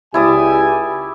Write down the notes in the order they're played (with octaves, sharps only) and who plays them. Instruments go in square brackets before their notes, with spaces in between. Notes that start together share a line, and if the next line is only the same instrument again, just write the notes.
[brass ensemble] C#2 G4 G#5 [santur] E4 D5 D#6